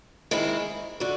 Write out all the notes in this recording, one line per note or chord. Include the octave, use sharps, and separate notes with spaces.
D#3 G#3 C4 E4
D3 F#4